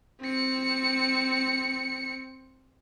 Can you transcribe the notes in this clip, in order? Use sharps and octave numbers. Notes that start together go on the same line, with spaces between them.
C4 C#7